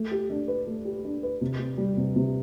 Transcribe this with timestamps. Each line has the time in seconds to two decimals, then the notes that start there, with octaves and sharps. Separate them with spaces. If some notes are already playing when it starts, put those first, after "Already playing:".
Already playing: A3
0.11 G4
0.30 D4
0.48 B4
0.67 A3
0.85 G4
1.04 D4
1.23 B4
1.41 C3
1.59 C4
1.78 G3
1.97 C3
2.16 C3